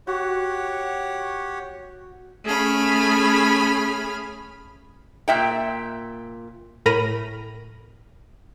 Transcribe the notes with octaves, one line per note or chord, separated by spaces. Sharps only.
F#4 G4 C#5 F#5
A3 C#4 G#4 B5 F6
A#2 E5 G5
A2 A#4 A#5 B5 A#6 D#7